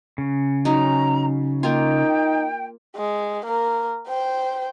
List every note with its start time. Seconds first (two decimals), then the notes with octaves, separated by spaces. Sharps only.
0.18 C#3
0.65 F#3 C#4 D#4 A#5
1.63 A#3 D#4 F4 G5
2.96 G#3
3.46 A#3 A#4
4.08 C5 G5